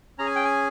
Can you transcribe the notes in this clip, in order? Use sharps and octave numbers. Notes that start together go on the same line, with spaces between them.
C#4 G#4 A#5
G#5
G5
G#5